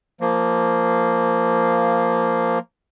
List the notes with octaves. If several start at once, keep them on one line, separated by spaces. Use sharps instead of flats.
F3 A#3